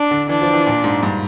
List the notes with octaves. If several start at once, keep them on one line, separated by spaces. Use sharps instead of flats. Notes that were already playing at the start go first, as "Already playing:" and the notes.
Already playing: D4
D3
E3 D4
F3
E3
A#2
G#2
G2